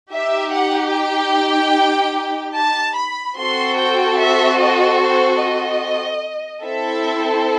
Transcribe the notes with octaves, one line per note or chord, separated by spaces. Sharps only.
D#4 G4 E5
F#5
G5
A5
B5
C4 F#4 A4 C6
G5
E5
D#5
C5
D#5
C4 E4 A4 E5